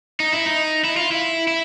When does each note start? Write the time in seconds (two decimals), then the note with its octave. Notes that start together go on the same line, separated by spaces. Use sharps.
0.20 D#4
0.33 E4
0.46 D#4
0.84 E4
0.97 F4
1.11 E4
1.48 E4